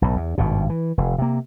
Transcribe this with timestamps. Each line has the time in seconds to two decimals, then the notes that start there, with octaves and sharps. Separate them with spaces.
0.02 B1 A2
0.16 E2
0.38 G#1 G2 B2
0.70 E3
0.98 F1
1.18 C3 A#3